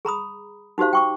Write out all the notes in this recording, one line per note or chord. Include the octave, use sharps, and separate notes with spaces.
G#4 A#5 B5 D#6
D#4 F#4 G4 C5 F5
G5 C#6 D6